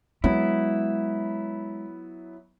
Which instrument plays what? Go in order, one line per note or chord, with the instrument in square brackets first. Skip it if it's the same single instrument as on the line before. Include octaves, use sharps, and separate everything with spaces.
[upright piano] F#3 B3 [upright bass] G#3 [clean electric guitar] E4